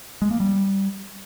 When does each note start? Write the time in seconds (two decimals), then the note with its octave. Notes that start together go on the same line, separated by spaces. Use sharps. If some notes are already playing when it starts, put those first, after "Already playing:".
0.22 G#3
0.31 A#3
0.40 G3